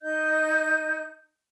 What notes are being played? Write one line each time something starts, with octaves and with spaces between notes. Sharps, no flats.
D#4 D#5 G6